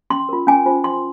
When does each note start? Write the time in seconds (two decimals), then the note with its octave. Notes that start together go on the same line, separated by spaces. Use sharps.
0.10 C#4 C6
0.29 F4 A#4
0.47 C#4 G#5
0.66 F4 C5
0.84 C#4 C6